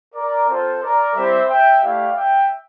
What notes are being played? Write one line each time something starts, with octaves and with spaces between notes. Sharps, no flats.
A#4 D5
C4 F4 A4 C5
A#4 D5
G3 C4 E4 G4 C5 E5
E5 G5
A3 E4 G4 D5 F5
E5 G5